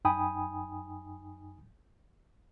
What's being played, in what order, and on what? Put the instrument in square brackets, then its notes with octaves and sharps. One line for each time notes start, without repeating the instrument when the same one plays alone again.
[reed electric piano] F#2 D#4 G5 G#5 B5 D#6